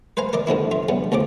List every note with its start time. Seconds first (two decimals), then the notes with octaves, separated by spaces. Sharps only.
0.17 B4 C5 F5 G#5 A#5
0.33 A#4 D5 D#5
0.47 G2 D3 F3 E4
0.71 F4 E5
0.89 C#3 G3 B3
1.12 D2 C#3 F3 D6